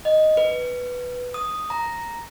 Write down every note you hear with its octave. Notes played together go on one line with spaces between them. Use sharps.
D#5
B4
D#6
A#5